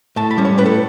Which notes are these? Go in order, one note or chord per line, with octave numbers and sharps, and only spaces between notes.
A2 A5
B5
G3 C#4
C#5
A2 B4
A4